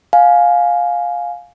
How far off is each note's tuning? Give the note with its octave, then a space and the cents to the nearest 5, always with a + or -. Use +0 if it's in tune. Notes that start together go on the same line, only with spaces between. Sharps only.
F5 +15 G#5 +10